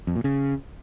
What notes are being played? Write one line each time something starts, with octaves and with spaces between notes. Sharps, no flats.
F2
A#2
C#3